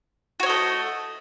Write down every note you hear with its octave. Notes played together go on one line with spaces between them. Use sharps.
A3 F#4 C#5 D#5